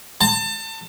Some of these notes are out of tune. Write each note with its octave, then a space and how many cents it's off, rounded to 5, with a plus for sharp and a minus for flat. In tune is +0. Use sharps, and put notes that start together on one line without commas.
A5 +30